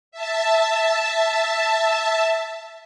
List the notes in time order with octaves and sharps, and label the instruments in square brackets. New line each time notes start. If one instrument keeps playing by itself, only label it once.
[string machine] E5 A5